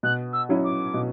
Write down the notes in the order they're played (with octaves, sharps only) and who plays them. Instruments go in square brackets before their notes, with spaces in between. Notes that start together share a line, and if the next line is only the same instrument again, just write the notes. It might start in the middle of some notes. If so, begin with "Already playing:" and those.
[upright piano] B2 [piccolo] F#6
[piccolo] E6
[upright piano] F#3 C#4 E4
[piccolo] D6
[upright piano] B2